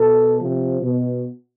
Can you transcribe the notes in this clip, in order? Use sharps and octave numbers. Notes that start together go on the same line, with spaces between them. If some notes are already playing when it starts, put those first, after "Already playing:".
Already playing: B2 A4
C3 F3
B2